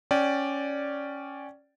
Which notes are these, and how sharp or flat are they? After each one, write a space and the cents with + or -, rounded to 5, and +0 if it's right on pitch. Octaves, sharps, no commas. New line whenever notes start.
C#4 +0 D5 +0 G5 -20